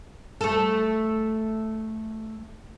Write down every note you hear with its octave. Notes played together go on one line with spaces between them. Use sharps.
A3 A4